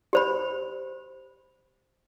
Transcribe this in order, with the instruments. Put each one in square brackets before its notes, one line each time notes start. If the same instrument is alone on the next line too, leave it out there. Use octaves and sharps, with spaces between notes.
[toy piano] G4 C5 B5